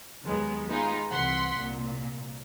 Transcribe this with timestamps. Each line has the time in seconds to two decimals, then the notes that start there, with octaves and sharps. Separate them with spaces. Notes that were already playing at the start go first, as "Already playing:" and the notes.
0.24 D#2 D#3 F#3 G#3 B3
0.69 G#3 B3 D#4 F4
1.11 C2 E3 F#5 C6 B6
1.57 C2 A#2